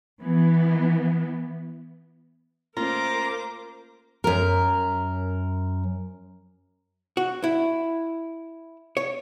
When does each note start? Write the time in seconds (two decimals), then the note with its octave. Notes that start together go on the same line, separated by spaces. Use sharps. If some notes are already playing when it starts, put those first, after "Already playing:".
0.22 E3 B3
2.77 A3 A#3 C#4 F4 A#4 C5 A#5 D6
4.24 F#2 A#4
7.17 F#4
7.44 E4
8.97 C#5